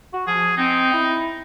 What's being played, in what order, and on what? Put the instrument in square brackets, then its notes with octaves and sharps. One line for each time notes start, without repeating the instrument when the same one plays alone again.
[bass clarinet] F#4
[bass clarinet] F3 [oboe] G#4
[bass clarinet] C4 [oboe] D#4
[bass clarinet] E4